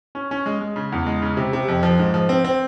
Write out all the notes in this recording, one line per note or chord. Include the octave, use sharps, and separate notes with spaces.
C#4
C#4
G#3
G#3
C#3
E2
G#3
C#3
C3
C3
F2
F3
G#2
F3
C4
C4